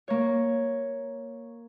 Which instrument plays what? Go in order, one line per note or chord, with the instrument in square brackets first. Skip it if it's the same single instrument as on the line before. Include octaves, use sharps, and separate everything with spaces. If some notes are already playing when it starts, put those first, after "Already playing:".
[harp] A#3 C#5